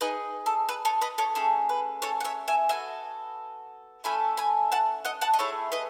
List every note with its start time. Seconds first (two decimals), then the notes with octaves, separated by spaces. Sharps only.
0.01 D#4 G#4 B4 D#5
0.46 A4
0.69 B4
0.85 A4 C#5
1.01 B4 D#5
1.18 A4 C#5
1.35 A3 C#4 G#4 A4
1.69 B4
2.02 A4 C#5
2.20 F#5
2.24 C#5 E5
2.48 E5 G#5
2.69 B3 F#4 A4 E5 G#5
4.04 A3 C#4 E4 A4 G#5 B5
4.37 G#5 B5
4.72 F#5 A5
5.05 D#5 F#5
5.21 F#5 A5
5.34 D#5
5.39 A3 E4 G#4 A4 C#5
5.72 B4 D#5